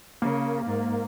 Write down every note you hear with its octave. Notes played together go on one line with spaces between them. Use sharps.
C#3 A#3
G#2